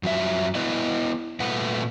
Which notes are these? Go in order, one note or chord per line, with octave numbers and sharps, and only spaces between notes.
F#2 F3 F#3 E5
B3 E4 B4 D5 D#5
A#2 A3 B4 F#5